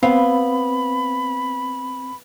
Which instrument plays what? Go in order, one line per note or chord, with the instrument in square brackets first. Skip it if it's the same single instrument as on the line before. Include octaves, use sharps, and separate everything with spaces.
[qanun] B3 [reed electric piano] C4 [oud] F5 [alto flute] B5